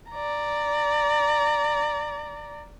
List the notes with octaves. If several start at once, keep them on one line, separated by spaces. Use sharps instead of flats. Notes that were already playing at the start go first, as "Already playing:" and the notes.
D5 A#5